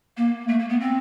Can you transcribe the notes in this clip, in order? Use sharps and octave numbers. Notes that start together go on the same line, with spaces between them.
A#3
A3
A#3
B3
C4